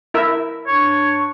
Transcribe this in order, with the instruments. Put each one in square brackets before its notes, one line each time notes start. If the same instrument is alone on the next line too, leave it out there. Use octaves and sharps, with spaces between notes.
[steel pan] E4 A#4 E5
[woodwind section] G2 D4 C#6 [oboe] C#5